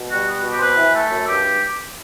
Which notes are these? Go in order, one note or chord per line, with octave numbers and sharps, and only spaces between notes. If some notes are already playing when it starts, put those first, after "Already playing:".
Already playing: B2
G3 F#4
B3
F#4
B2
G4
C5
C4 B4
E3
A3 A4
F#2
G2 G4